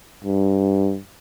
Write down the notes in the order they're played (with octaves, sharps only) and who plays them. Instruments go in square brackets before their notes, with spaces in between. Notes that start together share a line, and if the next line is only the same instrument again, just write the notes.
[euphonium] G2